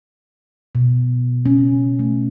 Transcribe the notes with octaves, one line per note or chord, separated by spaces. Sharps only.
B2
C#4
A3